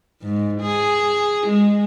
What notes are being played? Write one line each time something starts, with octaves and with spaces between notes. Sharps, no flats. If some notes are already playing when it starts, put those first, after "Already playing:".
G#2
G#4
G#3